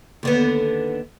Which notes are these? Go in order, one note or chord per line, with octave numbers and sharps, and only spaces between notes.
D#2 D3 B3